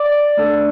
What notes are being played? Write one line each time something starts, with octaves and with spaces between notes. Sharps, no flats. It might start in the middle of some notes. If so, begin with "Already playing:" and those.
Already playing: D5 D6
A3 D4 A4